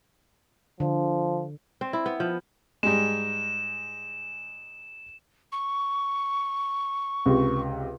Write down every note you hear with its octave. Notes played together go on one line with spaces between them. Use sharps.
D3 F3
C4
E4
B3
F3
G#2 G3 G#3 E7
C#6
C#2 C3